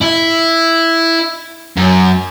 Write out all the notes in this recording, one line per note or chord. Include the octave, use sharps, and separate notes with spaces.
E4
F#2